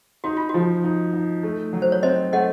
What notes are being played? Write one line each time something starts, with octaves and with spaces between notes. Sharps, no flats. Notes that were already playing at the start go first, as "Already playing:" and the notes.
D#4 F#4
F4
F3 F#4
D#4
D#4
A3
F#3
C5
C#5
C4 C5 D#5
A3 D#5 F#5